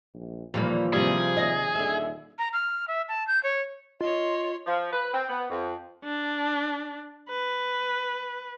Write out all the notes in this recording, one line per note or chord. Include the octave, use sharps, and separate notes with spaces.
A#1
D#2 A#2 E3 F3 G3 A#3
C3 G3 G#4
D#2 C3 D#5
D#1 D3 E5
A#5
F6
E5
A5
G6
C#5
F4 C#5 D#5 C6
F3
B4
C4
B3
F2
D4
B4